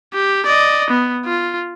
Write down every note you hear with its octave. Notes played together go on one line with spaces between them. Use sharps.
G4
D5 D#5
B3
F4